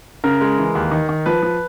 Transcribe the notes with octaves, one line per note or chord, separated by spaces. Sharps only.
C#3 A#4
G#3
E3
D#2
D#3
D#3
F3 B4
F3